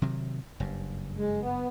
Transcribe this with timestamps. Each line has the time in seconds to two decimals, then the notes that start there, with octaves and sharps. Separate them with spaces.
0.02 C3 D#3 F#3
0.60 F#1 G2
1.16 G#3
1.41 B3